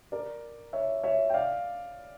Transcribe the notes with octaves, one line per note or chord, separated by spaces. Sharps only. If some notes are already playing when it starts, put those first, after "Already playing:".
A#4 D5
C#5 E5
C#5 E5
G5
D5 F5